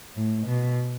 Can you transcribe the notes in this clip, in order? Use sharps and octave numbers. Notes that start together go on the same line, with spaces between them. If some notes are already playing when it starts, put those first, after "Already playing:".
A2
B2